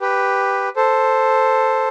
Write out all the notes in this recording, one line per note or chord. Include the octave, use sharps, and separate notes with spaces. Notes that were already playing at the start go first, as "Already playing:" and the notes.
G4 B4
A4 C5